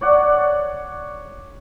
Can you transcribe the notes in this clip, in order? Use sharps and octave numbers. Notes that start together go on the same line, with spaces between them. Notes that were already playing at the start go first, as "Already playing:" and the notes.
C#5 D5 F#5